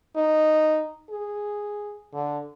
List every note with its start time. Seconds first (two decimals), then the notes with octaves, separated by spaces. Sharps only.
0.16 D#4
1.10 G#4
2.13 D3